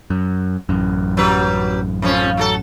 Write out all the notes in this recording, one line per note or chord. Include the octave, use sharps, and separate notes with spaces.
F#2
A1 F#2
F#3 G3 B4
F2 F3 C#4
F#3 F#4 A4